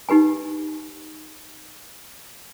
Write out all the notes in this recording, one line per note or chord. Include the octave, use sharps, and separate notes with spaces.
D#4 G4 B4 G#5